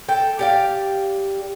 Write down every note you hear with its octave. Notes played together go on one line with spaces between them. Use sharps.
A4 G5
G4 D5 F5